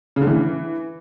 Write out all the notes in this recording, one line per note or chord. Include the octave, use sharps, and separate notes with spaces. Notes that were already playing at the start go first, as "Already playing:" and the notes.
C#3
D3
E3